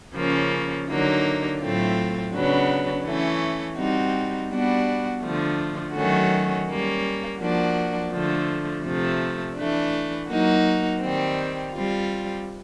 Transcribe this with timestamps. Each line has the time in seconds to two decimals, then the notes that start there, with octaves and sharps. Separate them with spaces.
0.15 C#3 F3 A#3 C#4
0.88 D3 F#3 A#3 D#4
1.60 A2 F#3 A3 C4 F4
2.33 C#3 F#3 B3 D4
3.05 E3 A3 C#4
3.77 G3 C4 D#4 F#4
4.50 G3 B3 D4 F#4
5.22 D3 F3 A3
5.94 D#3 F#3 A3 C#4 F#4
6.67 G3 A#3 C#4
7.39 F3 A#3 D4 F#4
8.11 D3 F3 A3
8.84 C3 F3 A3
9.56 E3 A3 D4
10.28 F#3 A#3 D#4 F#4
11.01 D#3 G3 C4
11.73 G3 C4 F4